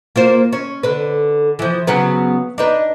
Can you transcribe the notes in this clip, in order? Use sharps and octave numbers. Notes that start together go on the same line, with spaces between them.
A#3 F4 C5
C#4
D3 B4
E3 F3
C#3 F#3 B3
D4 D#4 B4